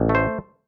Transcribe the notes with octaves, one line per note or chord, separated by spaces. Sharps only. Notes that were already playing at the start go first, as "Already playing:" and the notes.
Already playing: A1
A3
C5